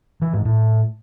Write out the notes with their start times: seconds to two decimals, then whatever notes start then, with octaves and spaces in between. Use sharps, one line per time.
0.22 E3
0.33 G#2
0.45 A2